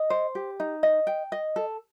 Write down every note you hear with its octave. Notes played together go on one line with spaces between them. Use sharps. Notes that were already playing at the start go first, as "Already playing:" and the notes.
Already playing: D#5
C5
G4
D#4
D#5
G5
D#5
A4